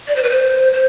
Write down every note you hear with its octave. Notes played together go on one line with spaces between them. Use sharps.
D5
C5
B4
C5
C5